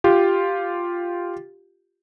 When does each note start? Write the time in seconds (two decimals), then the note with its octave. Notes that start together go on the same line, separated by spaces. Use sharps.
0.04 F4 G4